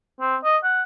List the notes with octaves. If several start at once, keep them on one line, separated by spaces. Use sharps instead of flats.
C4
D#5
F#5